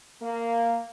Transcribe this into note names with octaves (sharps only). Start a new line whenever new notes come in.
A#3